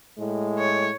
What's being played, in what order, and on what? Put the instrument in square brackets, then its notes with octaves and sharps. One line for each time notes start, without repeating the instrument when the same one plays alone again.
[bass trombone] A2 [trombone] G#3
[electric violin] C#5